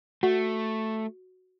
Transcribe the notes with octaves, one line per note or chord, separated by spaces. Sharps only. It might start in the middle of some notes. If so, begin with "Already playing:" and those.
A3 F#4